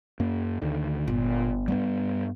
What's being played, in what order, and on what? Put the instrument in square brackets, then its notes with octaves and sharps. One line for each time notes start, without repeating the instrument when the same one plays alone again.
[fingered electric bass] F#2 A#3
D2 D3 D#3
[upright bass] G1 [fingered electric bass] A#2
[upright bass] G2 [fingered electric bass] G3 A#3 B3